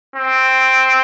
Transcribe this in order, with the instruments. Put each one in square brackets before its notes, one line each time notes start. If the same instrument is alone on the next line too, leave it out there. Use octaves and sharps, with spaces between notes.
[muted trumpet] C4